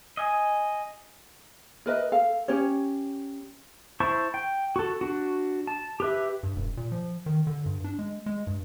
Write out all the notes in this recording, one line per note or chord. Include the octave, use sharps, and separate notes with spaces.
D#5 G#5
A#4 B4 D#5 E5
A4 F5
C#4 G4 C#5
E4 C5 A5 C#6
G5
F#4 A4
D4 F#4
A5
G4 B4 E5
G2
E1
A#2
F3
D#3
D3
G2
D4
G#3
G#3
G2